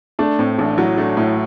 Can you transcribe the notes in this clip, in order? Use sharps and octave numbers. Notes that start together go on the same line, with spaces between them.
A3 D4
A2 C4
A1 D4
F#3 E4
A3 D4
A2 E4